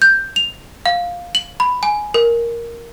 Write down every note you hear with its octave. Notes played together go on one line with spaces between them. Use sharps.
G6
F7
F5
F#7
B5
G#5
A#4